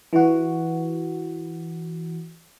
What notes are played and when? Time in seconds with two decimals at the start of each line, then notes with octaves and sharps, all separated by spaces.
0.13 E3 F#4